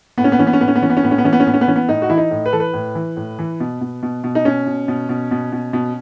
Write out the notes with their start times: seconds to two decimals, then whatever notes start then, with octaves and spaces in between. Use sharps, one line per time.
0.18 A2 B3
0.24 C#4
0.32 B3
0.39 E3 C#4
0.47 B3
0.53 C#4
0.60 A2 B3
0.68 C#4
0.75 B3
0.82 E3 C#4
0.90 B3
0.97 C#4
1.03 A2 B3
1.11 C#4
1.18 B3
1.24 E3 C#4
1.33 B3
1.40 C#4
1.46 A2 B3
1.54 C#4
1.61 B3
1.67 E3 C#4
1.76 B3
1.88 A2 D#4
2.02 F#4
2.10 E3 E4
2.18 D#4
2.31 A2
2.46 B4
2.53 E3 A4
2.60 B4
2.74 A2
2.95 E3
3.17 A2
3.39 E3
3.60 B2
3.81 B2
4.03 B2
4.24 B2
4.35 D#4
4.45 B2 C#4
4.66 B2
4.88 B2
5.09 B2
5.31 B2
5.52 B2
5.73 B2